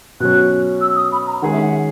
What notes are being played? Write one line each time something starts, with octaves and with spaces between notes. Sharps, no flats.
B2 F#3 C#4 F#6
E6
D#6
B5
A#5
D#3 G#3 C#4 G#4 F#5
E5
F#5